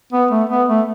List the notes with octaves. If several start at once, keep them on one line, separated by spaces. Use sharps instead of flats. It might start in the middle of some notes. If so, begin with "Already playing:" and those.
B3
A3
B3
A3